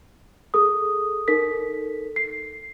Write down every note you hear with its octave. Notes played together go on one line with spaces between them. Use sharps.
G#4 A4 D#6
D#4 A4 A#4 B6
C7